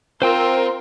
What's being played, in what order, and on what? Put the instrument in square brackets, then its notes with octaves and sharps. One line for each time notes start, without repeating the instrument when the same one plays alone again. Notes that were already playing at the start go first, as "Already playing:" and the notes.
[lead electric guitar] C4 [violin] F4 [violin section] A#4 [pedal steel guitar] C5 G5 E6